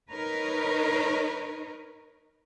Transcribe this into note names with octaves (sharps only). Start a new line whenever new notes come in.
D#4 A#4 B4 C#5